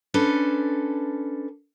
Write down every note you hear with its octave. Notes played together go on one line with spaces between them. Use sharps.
C#4 D4 A4 B4 C5